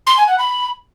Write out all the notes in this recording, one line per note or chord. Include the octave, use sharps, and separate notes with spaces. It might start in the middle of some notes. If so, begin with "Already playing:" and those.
C6
G#5
F#5
B5